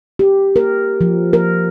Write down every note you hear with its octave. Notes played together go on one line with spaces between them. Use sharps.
G4
A#4
F3
A#4